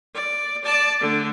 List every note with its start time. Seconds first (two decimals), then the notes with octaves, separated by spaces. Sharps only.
0.15 D5
0.64 D5 A5
1.01 D3 A3